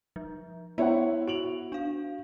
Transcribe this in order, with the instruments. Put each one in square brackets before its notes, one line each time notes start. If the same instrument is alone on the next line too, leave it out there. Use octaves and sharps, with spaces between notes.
[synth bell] F3
[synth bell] B3 [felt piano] E4 [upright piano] C5 C#5 F#5
[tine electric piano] F#4 [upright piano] D7 F7 F#7
[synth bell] D4 F5